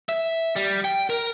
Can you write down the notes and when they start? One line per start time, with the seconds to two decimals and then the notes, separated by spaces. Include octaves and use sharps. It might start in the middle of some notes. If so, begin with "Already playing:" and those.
0.09 E5
0.56 G3
0.84 G5
1.10 A#4